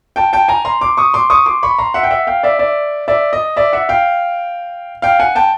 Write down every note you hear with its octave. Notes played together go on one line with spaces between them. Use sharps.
G5 A5
G5 A5
G#5 A#5
A#5 C6
C6 D6
C#6 D#6
C6 D6
C#6 D#6
C6 D6
B5 C#6
A#5 C6
E5 F#5
G5
E5 F#5
F5 G5
D5 E5
D5 E5
D5 E5
D#5
D5 E5
E5 F#5
F5 G5
F5 G5
F#5 G#5
G5 A5